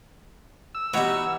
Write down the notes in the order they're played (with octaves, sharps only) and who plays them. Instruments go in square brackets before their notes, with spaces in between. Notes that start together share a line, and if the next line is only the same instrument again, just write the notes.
[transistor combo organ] E6
[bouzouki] E3 G3 [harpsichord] B3 D#4 C#5 [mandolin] F#4